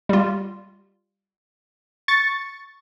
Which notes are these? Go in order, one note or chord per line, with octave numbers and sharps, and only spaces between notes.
G3 F4
C#6 A6